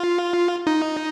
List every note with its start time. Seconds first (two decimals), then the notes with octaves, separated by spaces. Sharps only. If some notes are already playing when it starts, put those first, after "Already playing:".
Already playing: F4
0.67 D#4